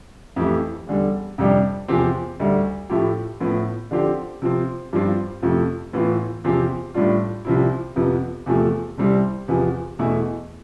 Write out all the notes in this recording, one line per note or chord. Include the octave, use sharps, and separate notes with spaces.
F2 E3 A3 E4 G4
E2 D3 G3
F2 C3 G3 D4 G4
E2 C3 F3 C4 G4
D2 D3 G3
A2 F3 A3 E4 G4
A2 F3 B3 E4
D3 F3 C4 G4
C3 F3 C4
G2 F3 C4 F4
F2 C3 F3 A3
A2 E3 B3 F4
E2 C3 F3 C4 G4
A2 G3 D4 F4
C2 C3 F3 C4 E4
F2 C3 F3 B3
E2 C3 F3 A3
C2 C3 G3 C4 E4
E2 C3 F3 B3
E2 B2 A3 E4